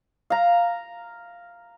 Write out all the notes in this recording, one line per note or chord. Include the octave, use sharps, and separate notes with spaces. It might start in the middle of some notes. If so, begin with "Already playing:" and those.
F5 A#5